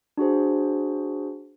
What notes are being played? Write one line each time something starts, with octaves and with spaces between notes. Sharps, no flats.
D4 F#4 G#4 C5